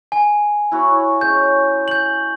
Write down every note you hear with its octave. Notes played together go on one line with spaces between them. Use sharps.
G#5
E4 F#4 C#5
G#3 C#4 G6
G6 F#7